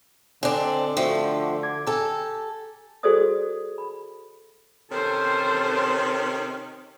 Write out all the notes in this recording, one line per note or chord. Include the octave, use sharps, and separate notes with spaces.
D3 C4 D4 D#5 G#5
F3 A3 D4 F#4 G5
D6 G#6
G4 A4 G#5 A#5
F#4 G#4 A4 C5 D5 D#6
B5
C3 D#3 C#4 A4 C5